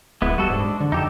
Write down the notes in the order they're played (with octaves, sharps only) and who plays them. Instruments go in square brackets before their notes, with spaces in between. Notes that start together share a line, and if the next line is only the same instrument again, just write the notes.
[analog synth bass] D1 [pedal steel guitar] G#3 B3 E4
[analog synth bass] G3 [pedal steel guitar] F#4 A4
[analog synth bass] G#2 [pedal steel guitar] D4
[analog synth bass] G#3
D3
[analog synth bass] F2 [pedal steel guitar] D#4 G4 A4